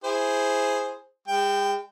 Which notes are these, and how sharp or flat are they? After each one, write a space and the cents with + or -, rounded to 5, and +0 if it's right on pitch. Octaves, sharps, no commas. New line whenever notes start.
E4 +0 G#4 +0 C5 +0
G#3 -45 G5 +0